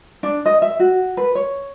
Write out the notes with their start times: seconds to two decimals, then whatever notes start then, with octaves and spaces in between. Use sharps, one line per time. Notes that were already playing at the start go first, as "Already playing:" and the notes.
0.23 D4
0.45 D#5
0.62 E5
0.79 F#4
1.17 B4
1.35 C#5